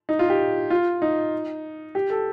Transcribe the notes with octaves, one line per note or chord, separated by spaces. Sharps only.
D#4
F4
G4
F4
D#4
G4
A4